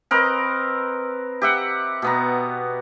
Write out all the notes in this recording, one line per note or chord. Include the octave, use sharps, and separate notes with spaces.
C4 A#4 B4 D#5
G4 E5 F#5
B2 B3 A#5